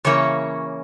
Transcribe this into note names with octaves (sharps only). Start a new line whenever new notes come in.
C#3 E3 A#3 C#4 C#5